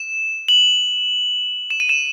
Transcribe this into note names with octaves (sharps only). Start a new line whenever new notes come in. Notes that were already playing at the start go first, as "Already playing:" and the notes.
Already playing: E7
F#7
E7
D#7
E7